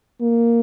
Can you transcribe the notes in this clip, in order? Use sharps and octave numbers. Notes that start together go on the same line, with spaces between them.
A#3